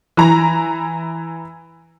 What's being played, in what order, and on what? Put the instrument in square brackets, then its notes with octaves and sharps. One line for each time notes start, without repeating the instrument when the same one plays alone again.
[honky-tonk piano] E3 A#5